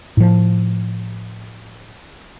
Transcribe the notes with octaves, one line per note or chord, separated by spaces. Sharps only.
A2 F3